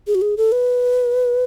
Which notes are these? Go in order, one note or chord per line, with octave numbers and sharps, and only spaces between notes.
G#4
F#4
G#4
A4
B4